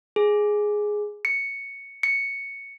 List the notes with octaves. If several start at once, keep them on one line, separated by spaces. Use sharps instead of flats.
G#4
C#7
C#7